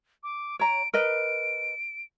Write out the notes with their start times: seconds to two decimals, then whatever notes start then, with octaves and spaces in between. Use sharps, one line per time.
0.23 D6
0.59 C#5 A#5 D7
0.93 A#4 B4 D#5 D7